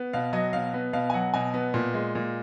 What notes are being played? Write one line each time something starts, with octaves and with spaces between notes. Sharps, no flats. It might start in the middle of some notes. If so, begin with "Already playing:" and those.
Already playing: B3
B2 F5
F#3 D#5
B2 F5
B3
B2 F5
G#5
F#3 F#5
B2 G#5
B3
A#2
G#3
A#2